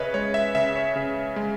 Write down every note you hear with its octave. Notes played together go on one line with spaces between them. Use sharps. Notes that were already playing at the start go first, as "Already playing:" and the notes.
Already playing: C#3 B4 C#5 D#5 E5
G#3 C#5
E5
C#3 E5
C#5
C#3
G#3